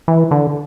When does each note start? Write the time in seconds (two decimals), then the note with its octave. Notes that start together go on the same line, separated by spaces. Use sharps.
0.08 E3
0.31 D3